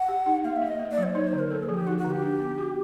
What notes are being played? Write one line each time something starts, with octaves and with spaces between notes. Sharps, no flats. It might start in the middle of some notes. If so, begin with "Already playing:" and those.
Already playing: F#5
G4
D#4
A#3 F5
E5
A#3
D#5
A#3
D5
F#3
C5
D#4 C#5
C5
D3
A#4
A#3 A4
G#4
F3
G4
D#4 F#4
F#4
D3
G4
D4
B3
F#4